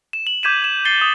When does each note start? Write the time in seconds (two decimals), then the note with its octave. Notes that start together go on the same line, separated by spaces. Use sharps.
0.13 E7
0.27 F#7
0.43 D6 G6 G#6 B6 D#7 E7
0.62 G#6 E7
0.85 G#6 A6 C7 C#7 G7
1.01 D#6